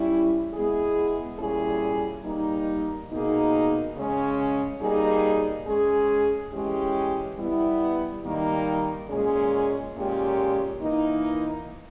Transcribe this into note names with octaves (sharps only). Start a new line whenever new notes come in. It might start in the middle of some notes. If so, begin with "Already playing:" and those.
Already playing: G3 C#4 E4
G#3 B3 E4 G#4
A#2 G3 C#4 E4 G#4
G3 A#3 D#4
B2 A#3 D#4 G#4
C#3 G#3 C#4
G3 A#3 D#4 G#4
G#3 C#4 G#4
E3 G#3 C#4 G4
G3 B3 E4
D#3 G3 A#3 D#4
A#2 G#3 C#4 G#4
A#2 G#3 C#4 G4
E3 A#3 D#4